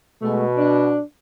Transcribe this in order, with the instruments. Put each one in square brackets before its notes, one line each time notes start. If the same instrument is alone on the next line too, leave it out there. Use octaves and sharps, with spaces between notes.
[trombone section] B2 [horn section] G#3 A3
[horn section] D4